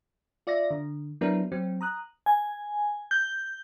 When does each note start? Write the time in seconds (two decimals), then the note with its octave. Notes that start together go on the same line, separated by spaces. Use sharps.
0.47 F4 D5 E5 A#6
0.71 D3
1.21 F#3 B3 D4 E4 A#4
1.52 F#3 C4
1.81 A#5 D#6 F#6
2.26 G#5
3.11 G6